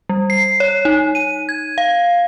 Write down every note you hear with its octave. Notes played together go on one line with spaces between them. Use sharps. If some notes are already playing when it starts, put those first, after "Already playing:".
G3
C7
C#5
D#4
D#7
G#6
F5